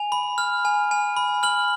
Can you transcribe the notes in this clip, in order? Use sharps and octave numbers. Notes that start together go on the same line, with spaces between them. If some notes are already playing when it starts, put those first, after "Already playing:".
Already playing: G#5 F7
B5
F6
G#5
G#5
B5
F6 F#7